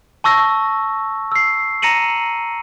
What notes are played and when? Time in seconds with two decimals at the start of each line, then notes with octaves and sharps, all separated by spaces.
0.24 A5 C#6 E6 A#6
1.32 E6 C7
1.82 A#5 A#6 C#7 D#7 F#7